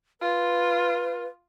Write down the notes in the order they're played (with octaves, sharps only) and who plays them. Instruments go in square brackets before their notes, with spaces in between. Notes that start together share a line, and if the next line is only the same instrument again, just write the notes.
[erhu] F4 [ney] B4